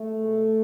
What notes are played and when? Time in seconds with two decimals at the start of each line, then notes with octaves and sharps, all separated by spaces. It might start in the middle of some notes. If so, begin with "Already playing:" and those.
Already playing: A3
0.17 B2 G#3